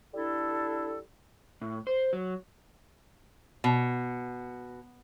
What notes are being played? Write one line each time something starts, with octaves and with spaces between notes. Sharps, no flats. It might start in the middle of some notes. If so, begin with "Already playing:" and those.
G3 D4 E4 A4
A2
C5
F#3
B2